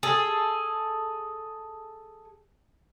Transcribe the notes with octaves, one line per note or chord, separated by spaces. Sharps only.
G#4 A4